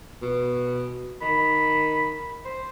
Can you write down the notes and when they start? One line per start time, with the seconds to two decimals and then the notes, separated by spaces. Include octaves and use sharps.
0.22 B2
1.22 D#3 B5
2.45 C5